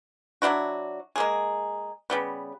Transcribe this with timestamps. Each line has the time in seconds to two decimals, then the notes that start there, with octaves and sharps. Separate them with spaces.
0.42 F#3 D4 E4 F#4
1.16 G#3 A#3 G#4
2.10 C#3 G3 B3